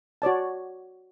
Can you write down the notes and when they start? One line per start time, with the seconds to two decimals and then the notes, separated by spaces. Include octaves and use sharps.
0.22 F#4 C#5 D5 A5